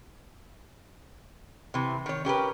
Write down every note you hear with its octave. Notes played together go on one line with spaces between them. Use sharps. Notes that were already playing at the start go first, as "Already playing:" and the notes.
C3 E3
D#3 C#5
C#4 G4 A#4 B4